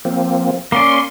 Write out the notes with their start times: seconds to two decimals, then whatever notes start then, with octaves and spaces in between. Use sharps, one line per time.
0.05 F3 A#3 C4
0.72 A#3 C#4 D5 C6